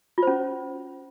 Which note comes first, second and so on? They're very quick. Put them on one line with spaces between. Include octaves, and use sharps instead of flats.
F4 C5 C#4